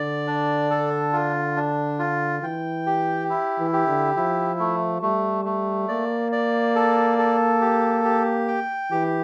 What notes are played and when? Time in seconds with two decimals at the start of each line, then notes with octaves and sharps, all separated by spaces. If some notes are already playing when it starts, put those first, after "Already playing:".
Already playing: D3 D5
0.27 D4
0.70 A4
1.13 F4
1.56 D4
1.99 F4
2.42 E3 G5
2.86 G4
3.30 E4
3.59 E3
3.73 G4
3.87 D3
4.16 F3 E4
4.59 A3
5.02 G3 A3
5.45 A3
5.88 A#3 D5
6.32 D5
6.76 A4
7.18 A4
7.61 G4
8.04 G4
8.48 G5
8.91 E3 G4